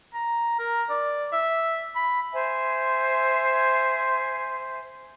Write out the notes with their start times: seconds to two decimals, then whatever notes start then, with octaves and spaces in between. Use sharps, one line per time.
0.14 A#5
0.59 A#4
0.90 D5
1.33 E5
1.96 B5
2.33 C5 E5 G#5